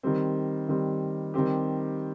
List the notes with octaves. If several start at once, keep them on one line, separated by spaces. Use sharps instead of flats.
D#3 G3 C4
D#3 G3 C4
D#3 G3 C4 G4